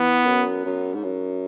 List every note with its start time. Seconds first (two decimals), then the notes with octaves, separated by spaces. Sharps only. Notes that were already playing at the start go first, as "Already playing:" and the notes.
Already playing: E3 B3
0.26 F#2
0.65 F#2
0.94 G#2
1.04 F#2